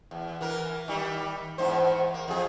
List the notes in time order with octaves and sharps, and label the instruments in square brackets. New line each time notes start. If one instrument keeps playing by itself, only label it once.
[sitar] E2
E3 A#4
D#3 G3
E2 G#2 C5
A#3
F2 G#4